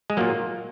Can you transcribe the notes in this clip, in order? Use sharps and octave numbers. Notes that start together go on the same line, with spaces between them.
G#3
A#2 F#3 A#3